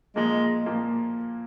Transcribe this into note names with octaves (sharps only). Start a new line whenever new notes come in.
A#2 F3 G#3 A#3
A#2 F3 A#3